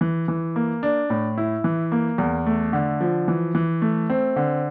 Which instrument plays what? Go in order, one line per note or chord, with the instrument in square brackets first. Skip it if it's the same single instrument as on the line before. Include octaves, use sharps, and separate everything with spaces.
[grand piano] E3
E3
A#3
D4
A2
E4
E3
A#3
E2
A3
D3
F3
E3
E3
A3
C4
D3